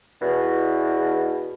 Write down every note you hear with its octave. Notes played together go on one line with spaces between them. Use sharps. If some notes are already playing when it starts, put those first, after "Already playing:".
E2 B2